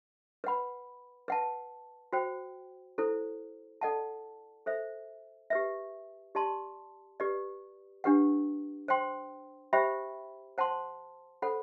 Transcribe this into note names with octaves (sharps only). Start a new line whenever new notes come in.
B4 F#5 B5
B4 F#5 A5
F#4 C5 G5
E4 A4 C5
A4 D5 F#5 A5
A4 C5 E5
G4 B4 E5
G4 D5 A5 C6
G4 B4 D5
D4 G4 B4 F#5
C5 G5 C6
G4 C5 E5 G5 B5
C5 F#5 A5 C6
A4 C5 F#5 B5